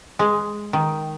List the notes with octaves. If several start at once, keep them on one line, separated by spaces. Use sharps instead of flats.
G#3
D#3